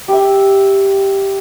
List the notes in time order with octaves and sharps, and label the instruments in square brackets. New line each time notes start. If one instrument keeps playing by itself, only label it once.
[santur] G4 E5